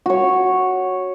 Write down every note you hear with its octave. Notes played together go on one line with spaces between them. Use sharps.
F#4 C#5